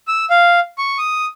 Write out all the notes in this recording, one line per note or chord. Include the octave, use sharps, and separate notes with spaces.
E6
F5
C#6
D#6